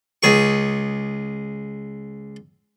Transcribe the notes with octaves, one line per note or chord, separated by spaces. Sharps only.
C#2 G#4 C#6